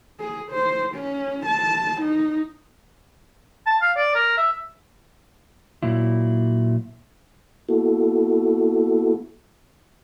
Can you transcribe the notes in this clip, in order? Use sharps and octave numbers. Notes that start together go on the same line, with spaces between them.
G#4
C5
C#4
A5
D#4
A5
F5
D5
A#4
E5
A#2 F#3 E4
A#3 B3 E4 F#4 A4